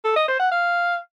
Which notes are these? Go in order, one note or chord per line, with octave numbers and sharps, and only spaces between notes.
A4
D#5
C5
F#5
F5